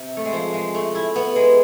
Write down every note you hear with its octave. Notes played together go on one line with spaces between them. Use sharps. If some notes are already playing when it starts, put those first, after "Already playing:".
Already playing: C3
A3
G#3
F3
G#3
A3
E4
B3
G#3